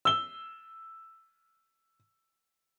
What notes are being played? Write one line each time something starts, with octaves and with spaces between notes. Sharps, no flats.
E6 G7